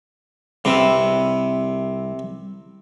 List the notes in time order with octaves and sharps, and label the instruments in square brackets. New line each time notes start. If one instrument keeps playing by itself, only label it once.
[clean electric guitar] C2 B4 E5 [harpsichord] C3